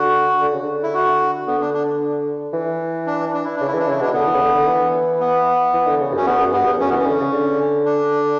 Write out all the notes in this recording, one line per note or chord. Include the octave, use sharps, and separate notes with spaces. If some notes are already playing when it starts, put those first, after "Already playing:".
Already playing: D3 F#4
D3
C#3
D3
E4
F#4
D3 B3
D4
D4
E3
D4
D4
E4
C#3 D4
E4
E3
D4
C#3 E4
B2 D4
D3 B3
E3
C#3
D3
D3
E3
B3
E3
D3
C#3
F#2 C#4
E2 B3
F#2
G2 B3
E2
F#2 C#4
E3 B3
C#4
D3
C#3
D3
D4